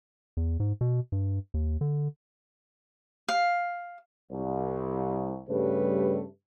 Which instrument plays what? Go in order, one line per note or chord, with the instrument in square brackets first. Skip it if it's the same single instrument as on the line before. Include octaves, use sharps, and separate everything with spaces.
[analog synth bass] E2
G#2
B2
G2
D#2
D3
[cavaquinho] F5
[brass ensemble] C2
G2 C#3 G3 A3 B4